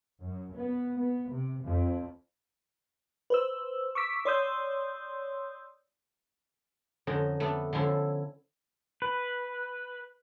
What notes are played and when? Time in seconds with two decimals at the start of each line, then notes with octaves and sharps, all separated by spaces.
0.21 F#2
0.55 B3
0.98 B3
1.32 C3
1.64 F2
3.30 B4 C5 E6
3.95 C#6 D6 E6 B6
4.25 C#5 D5 C6 D#6 E6 G6
7.07 F2 D3 C#4 D#4
7.40 A3 B3 D4
7.73 D3 F3 C#4 E4 A4
9.02 B4